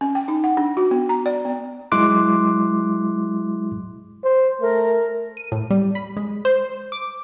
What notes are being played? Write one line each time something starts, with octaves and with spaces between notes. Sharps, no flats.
C#4
G5
D#4
F#5
D4
F#4
B3
A#5
D5
B3
F#3 G#3 E4 C6 D6 F#6
C5
A3 A#4
D#7
A2
G3
B5
G#3
C5
D6